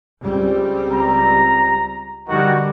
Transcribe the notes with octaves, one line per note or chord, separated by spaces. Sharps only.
C#2 G3 C4
A#5
D3 D#3 G3 F#4